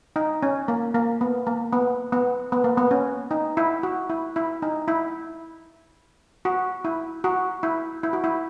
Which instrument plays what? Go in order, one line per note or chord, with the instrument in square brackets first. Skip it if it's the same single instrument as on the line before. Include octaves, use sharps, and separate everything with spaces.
[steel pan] D#4
C#4
A#3
A#3
B3
A#3
B3
B3
B3
A#3
B3
C#4
D#4
E4
F#4
E4
E4
D#4
E4
F#4
E4
F#4
E4
E4
F#4
E4